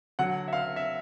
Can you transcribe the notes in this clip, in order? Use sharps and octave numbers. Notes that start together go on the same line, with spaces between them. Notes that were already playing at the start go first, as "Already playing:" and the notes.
D3 F#3 F#5
E5
F5
E5